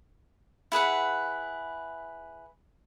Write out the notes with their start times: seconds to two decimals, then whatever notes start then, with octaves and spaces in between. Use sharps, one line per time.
0.72 E4 G#4 B4 F#5